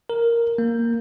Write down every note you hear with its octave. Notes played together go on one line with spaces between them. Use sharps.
A#4
A#3